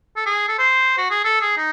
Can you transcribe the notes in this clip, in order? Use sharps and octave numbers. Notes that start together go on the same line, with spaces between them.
A4
G#4
A4
C5
F#4
G#4
A4
G#4
D#4